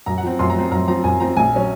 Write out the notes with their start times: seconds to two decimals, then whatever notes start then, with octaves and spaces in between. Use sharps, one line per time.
0.06 F#2 A#5
0.18 F#5
0.23 F3 C4
0.39 F#2 C6
0.50 A#5
0.56 F3 C4
0.71 F#2 A#5
0.88 F3 C4 A#5
1.04 F#2 G#5
1.20 F3 C4 A#5
1.36 A#1 G#5
1.54 F#3 C#4